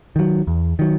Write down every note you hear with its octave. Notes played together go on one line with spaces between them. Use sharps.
D#3 F#3
E2
D#3 F#3